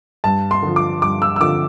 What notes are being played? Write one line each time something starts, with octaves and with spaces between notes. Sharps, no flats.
G2 A5
C6
D3 F3
D6
G2 D6
E6
E6
D3 F3 D6